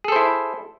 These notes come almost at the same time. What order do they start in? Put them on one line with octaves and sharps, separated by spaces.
G#4 A4 C5 E4